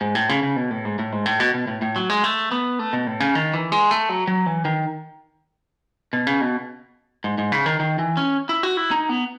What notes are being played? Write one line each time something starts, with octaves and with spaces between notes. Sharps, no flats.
G#2
A2
C#3
C#3
B2
A2
G#2
A2
G#2
A2
B2
B2
A2
A2
F#3
G#3
A3
B3
A3
B2
A2
C#3
D#3
E3
G#3
A3
F#3
F#3
E3
D#3
B2
C#3
B2
G#2
G#2
C#3
D#3
D#3
E3
C#4
E4
F#4
E4
D#4
B3